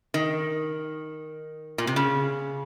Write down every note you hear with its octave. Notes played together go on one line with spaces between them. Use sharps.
D#3
A#2
C3
C#3